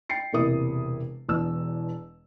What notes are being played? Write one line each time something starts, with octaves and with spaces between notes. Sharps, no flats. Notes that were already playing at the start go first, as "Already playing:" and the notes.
G5 A6 C7 C#7
E1 C3 A#3 E4 D#6
E1 E2 B2 E6